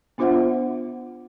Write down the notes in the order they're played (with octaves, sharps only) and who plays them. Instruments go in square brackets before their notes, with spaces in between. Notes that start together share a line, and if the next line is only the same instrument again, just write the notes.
[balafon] B3 D4 F4 C5 E5 F#5